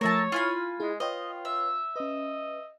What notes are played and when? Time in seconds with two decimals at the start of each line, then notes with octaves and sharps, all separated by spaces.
0.01 F3 A3 A#4 C#5 E5 A5
0.32 E4 F4 G#5 B5
0.80 G#3 E4 G#4
1.00 F4 B4 C#5 D#5 G5
1.45 E5
1.96 C#4 B4 D#5